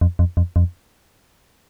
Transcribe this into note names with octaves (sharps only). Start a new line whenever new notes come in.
F2
F2
F2
F2